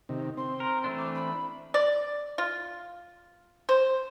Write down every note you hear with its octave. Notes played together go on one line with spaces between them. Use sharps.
C3 D#3
C4 C6
A#4
E3 A3 D4
D6
B5
D5
F4
C5